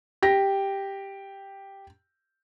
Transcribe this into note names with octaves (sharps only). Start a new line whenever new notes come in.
G4 A#6